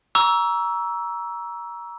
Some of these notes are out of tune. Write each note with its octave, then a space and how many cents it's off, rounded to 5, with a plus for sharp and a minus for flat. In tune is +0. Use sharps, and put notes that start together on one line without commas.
A#5 +20 C#6 +40 E6 +0